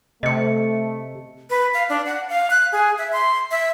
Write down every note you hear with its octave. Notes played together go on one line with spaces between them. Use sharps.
C3 A3 D#5 C#7
B4
F5
D4
F#5
F5
F#6
G#4
E5
C6
E5